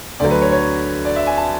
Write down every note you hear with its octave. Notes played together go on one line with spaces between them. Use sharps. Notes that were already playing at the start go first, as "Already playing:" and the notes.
D2 D3 F#3 D5
B4
C#5
C#5
D5
E5
G#5
A5